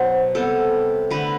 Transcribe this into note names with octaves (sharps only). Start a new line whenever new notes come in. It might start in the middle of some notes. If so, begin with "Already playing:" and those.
Already playing: B2 F#3 B3 C5
C3 G3 B3 A4
D3 A3 B4